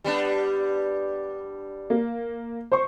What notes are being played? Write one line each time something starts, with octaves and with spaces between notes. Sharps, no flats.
G3 B3 D4
A#3
C5 C#6